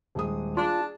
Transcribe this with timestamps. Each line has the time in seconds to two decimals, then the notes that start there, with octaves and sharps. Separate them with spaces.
0.15 D#1 G#3 D#6
0.57 D4 F4 G#4 A5